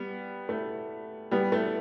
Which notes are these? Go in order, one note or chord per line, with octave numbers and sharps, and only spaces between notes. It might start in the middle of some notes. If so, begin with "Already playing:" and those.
Already playing: G3 B3
A3
G3 B3
A3